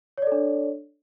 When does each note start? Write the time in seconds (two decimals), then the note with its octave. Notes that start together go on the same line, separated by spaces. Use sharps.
0.18 C#5
0.22 D5
0.27 A4
0.32 D4